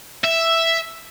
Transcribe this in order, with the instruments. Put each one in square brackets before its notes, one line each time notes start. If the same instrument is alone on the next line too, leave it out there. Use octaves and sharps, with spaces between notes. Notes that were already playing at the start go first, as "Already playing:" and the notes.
[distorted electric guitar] E5